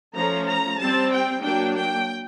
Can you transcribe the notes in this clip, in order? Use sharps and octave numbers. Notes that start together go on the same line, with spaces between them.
F3 A3 C#4 A#5
A#5
G3 C4 A5
G5
F#3 A#3 D4 G5
G5